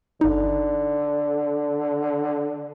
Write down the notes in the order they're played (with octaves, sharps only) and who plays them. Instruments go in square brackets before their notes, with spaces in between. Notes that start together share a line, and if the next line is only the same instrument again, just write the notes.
[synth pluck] G1 D#4 [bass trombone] D3